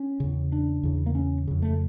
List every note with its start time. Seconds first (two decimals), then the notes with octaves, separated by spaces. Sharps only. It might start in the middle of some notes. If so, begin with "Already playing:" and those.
Already playing: C#4
0.20 E2 C#3
0.52 D4
0.83 E2 C#3
1.06 A#3
1.15 C#4
1.47 F2 C#3
1.62 A3